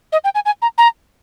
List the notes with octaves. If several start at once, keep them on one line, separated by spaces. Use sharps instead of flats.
D#5
G5
G#5
G#5
A#5
A#5